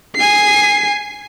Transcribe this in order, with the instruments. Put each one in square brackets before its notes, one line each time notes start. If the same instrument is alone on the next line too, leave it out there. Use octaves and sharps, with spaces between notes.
[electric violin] G#5 C7